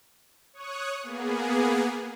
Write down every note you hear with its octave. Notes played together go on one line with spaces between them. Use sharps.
C#5 C#6 D#6 F#6
A#3 B3 G#4